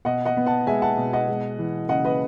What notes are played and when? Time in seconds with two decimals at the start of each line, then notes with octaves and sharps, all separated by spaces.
0.05 B2 D#5 F#5
0.25 D#5 F#5
0.37 B3
0.46 F#5 A5
0.67 G#3 E5 G#5
0.82 F#5 A5
0.98 B2
1.13 D#5 F#5
1.28 G#3
1.59 E3
1.89 C#3 D#5 F#5
2.05 B4 D#5